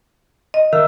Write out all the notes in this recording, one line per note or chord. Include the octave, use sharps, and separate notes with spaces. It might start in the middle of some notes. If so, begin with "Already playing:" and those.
D#5
D#3 A#4 E5 E6